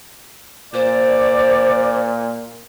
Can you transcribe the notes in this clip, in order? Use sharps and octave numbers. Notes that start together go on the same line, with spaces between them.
A#2 C5 D5